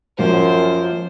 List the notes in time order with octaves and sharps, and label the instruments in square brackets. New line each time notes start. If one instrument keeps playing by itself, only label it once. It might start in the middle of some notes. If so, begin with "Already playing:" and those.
[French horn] F#2 [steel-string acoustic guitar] F3 A#3 [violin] C5